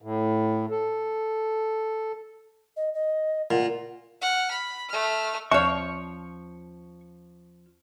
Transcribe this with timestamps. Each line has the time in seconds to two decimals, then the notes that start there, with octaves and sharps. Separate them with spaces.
0.02 A2
0.70 A4
2.77 D#5
2.94 D#5
3.51 A#2 F#5
4.21 F#5 F6
4.51 B5
4.89 A3 F6
5.51 D#2 F3 C#5 C#6